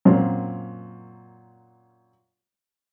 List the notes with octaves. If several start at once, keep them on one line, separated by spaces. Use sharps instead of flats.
F#2 A#2 C4